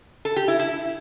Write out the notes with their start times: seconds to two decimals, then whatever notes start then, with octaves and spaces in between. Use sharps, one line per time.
0.25 A4
0.36 G4
0.48 E4
0.59 E4